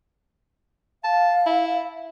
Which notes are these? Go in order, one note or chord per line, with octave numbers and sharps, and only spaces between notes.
F5 A5
E4